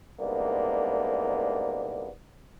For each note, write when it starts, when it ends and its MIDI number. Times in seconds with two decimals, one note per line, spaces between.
0.21 2.10 36
0.21 2.10 44
0.21 2.10 58
0.21 2.10 59
0.21 2.10 62